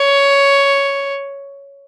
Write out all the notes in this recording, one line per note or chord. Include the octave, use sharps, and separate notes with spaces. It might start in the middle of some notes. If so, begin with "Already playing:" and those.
Already playing: C#5